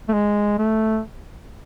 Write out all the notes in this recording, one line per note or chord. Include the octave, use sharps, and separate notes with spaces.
A3
G#3
A3